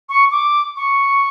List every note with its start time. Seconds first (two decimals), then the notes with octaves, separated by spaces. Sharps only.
0.09 C#6
0.31 D6
0.76 C#6